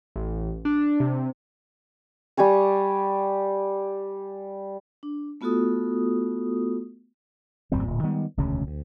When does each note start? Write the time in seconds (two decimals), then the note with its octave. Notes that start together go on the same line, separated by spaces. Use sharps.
0.16 A1
0.65 D4
1.00 C3
2.37 G3 G4 G#5 C#6
5.03 D4
5.41 A3 B3 F4 F#4 A4 D#6
7.72 G#1 F2 G3 C4
7.83 D1 A#2
8.03 D#3 G3 G#3 B3
8.37 E1 D2 C#3 C#4
8.67 D2